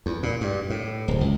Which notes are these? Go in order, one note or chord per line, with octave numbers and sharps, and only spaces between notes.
E2
A#2
G2
A2
D1
C#2